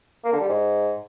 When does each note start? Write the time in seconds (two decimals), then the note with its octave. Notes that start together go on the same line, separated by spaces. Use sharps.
0.25 A#3
0.33 D3
0.41 G3
0.49 G#2